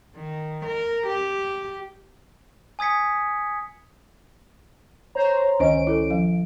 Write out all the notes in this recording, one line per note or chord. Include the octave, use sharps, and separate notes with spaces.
D#3
A#4
G4
G#5 D#6 G#6 B6 C#7
C5 C#5 A#5
C#2 D#3 C#4 C5 D#5 D7
E4 A4
F3 F5